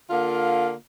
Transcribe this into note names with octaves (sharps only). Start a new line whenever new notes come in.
D3 A#3 F4